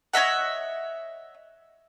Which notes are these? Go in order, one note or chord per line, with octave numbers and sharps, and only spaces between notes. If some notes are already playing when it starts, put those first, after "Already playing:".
C#5 D#5 E5 F#5